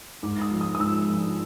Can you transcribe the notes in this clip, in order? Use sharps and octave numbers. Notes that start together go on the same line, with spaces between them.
G#2 D6
D#6
F3
D#6
D#6
G#2 E6
F3